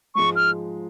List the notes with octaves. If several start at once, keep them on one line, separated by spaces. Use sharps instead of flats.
G#2 F3 G#3 C#6
F6